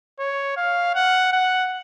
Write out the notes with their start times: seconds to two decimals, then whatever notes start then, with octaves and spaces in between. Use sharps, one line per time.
0.19 C#5
0.57 F5
0.95 F#5
1.32 F#5